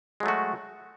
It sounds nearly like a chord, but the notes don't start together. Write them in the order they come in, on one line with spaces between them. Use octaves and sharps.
G#3 F#3 A3 F#4